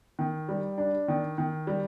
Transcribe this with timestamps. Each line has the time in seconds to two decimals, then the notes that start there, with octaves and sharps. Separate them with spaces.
0.19 D#3
0.49 G3
0.78 D4
1.08 D#3
1.38 D#3
1.67 G3